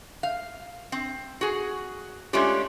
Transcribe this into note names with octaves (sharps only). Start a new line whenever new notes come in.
F5
C4
F#4 G#4
G#3 A3 C#4 D4 F4 G4